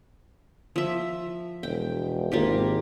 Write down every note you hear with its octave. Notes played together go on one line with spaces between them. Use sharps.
F3 E5
E1 G5
G#1 A#3 F4 G4